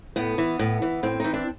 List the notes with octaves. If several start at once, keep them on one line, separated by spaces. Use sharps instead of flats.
A2 B3
E3
A2
E3
A2 C4
E3 D#4
D4